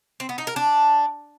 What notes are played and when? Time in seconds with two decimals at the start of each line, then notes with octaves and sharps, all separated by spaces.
0.20 C4
0.29 B3
0.38 D#4
0.47 A#4
0.56 D4